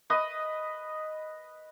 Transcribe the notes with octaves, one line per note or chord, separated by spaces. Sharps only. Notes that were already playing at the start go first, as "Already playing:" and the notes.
B4 D#5 D#6